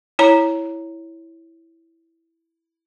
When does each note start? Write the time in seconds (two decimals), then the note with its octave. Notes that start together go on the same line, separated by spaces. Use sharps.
0.19 E4 C#5 A#5